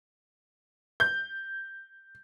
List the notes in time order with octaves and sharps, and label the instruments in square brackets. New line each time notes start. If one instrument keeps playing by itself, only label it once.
[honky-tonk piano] G6